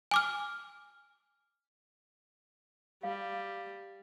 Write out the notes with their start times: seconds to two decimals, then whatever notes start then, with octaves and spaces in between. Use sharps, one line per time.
0.11 G#5 D6 F6
3.03 G3 F5